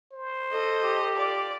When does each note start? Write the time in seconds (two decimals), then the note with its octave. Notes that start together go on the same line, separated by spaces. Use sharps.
0.12 C5
0.52 A4 D#5
0.83 G4
1.16 F4 D5